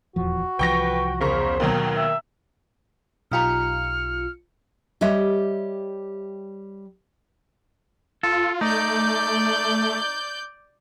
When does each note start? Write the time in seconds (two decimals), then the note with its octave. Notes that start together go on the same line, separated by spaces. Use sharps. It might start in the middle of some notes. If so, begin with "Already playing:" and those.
0.16 D#1 E2 F3 F#4
0.59 C2 E3 F3 B4 G5 C#6 A#6
1.21 E2 C#3 A#4 C5 C#6
1.60 D#2 B2 D#3 F#3
1.96 E5
3.32 B1 D#4 F4 G4 A#5 F6 C#7
5.01 G3 G4 C#5 D#5 E5
8.23 F4 A4
8.61 A3 D#4 D5 G6